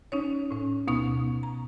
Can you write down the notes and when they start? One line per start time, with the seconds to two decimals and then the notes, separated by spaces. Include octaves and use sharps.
0.12 C#4 D#4 C#5
0.51 A2 C#4
0.87 D2 B2 B3 D#4 C#6 D#6
1.43 A#5